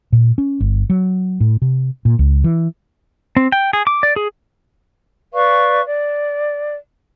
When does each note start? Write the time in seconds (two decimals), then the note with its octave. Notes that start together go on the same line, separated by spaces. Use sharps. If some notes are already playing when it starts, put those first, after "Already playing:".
0.13 A#2
0.38 C#4
0.60 G1
0.90 F#3
1.40 A2
1.62 C3
2.05 A#2
2.19 C#2
2.44 E3
3.37 C4
3.52 G5
3.73 G#4
3.87 D6
4.03 D5
4.16 G#4
5.34 B4 D5 F5 C#6
5.86 D5